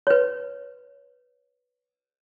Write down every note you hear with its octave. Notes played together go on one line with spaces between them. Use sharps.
B4 C#5